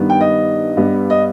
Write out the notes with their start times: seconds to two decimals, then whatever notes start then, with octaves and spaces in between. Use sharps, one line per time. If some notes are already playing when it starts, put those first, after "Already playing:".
Already playing: G2 D#3 G3 B3
0.10 G5
0.21 D#5
0.77 G2 G3 B3
1.10 D#5